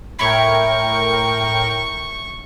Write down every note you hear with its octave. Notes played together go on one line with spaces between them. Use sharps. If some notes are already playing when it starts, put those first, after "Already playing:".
A2 E4 A#4 C#5 G5 C#6